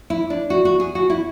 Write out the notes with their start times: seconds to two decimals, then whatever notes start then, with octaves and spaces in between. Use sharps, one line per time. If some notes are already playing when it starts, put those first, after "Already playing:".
0.10 E4
0.30 D4
0.50 F#4
0.65 F#4
0.80 G#4
0.95 F#4
1.10 E4